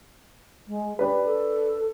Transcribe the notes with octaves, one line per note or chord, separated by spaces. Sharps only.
G#3
D4 G4 B4
A4